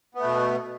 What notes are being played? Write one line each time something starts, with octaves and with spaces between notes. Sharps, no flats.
B2 A3 B3